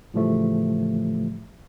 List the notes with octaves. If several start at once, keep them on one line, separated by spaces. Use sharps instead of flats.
A2 C#3 E3 F3 G3 A3